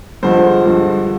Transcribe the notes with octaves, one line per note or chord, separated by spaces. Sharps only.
G2 D3 F3 G#3 C5
G2 D3 F3 G#3